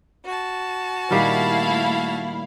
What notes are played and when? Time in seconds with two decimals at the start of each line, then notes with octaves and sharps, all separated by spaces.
0.25 F#4 A5
1.11 A#2 D#3 G3 A3 E4 F5